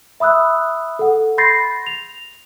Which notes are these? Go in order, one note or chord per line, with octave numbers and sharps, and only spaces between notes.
E5 B5 D#6 E6 F#6
A4 F#5
B5 C6 G6 A6 A#6 C7
F7